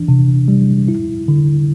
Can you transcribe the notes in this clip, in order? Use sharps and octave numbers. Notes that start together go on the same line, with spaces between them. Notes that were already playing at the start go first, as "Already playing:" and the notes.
Already playing: E3 D4
C3
G3
E4
D3